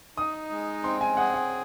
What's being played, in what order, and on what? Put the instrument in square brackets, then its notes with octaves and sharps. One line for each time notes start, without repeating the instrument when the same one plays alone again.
[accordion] D#4 [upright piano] D#6
[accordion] G#3
[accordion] C4 [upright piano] C6
[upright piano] G#5
[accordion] G#4 [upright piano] F#5
[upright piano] F#5